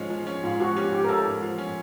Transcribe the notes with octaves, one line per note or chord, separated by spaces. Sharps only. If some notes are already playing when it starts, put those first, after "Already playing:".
Already playing: G#2 F3 G#3 C#4
F3
C#4
G#2 F4
F3 F#4
C#4 G4
G#2 G4
A#4
C#4 A4
G#2
F3
C#4